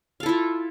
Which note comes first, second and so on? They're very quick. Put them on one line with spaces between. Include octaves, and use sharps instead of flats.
F5 A4 E4 F4